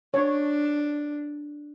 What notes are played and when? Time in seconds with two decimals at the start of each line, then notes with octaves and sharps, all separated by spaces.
0.14 D4 C#5